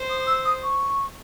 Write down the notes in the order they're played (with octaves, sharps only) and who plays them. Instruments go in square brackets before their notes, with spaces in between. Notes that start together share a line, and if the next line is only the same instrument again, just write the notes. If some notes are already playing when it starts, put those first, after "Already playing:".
Already playing: [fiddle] C5
[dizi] D#6
E6
D#6
C#6